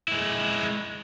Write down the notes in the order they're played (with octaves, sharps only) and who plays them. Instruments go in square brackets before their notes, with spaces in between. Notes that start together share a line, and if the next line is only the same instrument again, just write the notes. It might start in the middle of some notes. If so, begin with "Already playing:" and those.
[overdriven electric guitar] G#3 E4